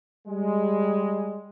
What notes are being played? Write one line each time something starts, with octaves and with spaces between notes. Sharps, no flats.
G3 G#3